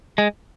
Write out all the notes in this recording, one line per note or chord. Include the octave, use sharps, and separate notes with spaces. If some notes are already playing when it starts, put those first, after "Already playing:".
G#3